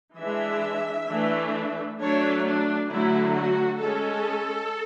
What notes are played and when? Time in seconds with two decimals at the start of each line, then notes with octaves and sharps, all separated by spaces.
0.18 E3 G#3 D4 E5
1.08 E3 A3 D4
2.00 F#3 A3 D4 C#5
2.45 D4
2.90 D3 F#3 A3 E4
3.35 F#4
3.81 G#3 C#4 A4